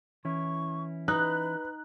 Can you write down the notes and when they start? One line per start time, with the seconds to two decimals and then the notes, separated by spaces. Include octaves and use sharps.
0.25 E3 C#4 E4 C#6
1.08 D#4 B4 F#6